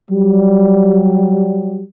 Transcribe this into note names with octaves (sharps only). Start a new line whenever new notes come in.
F#3 G3